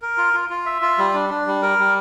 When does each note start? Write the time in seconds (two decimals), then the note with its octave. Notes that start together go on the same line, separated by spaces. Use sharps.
0.02 A#4
0.18 F4
0.34 F4
0.50 F4
0.66 E5
0.82 F4
0.98 G3
1.14 D4
1.30 D4
1.47 G3
1.62 A#4
1.78 G3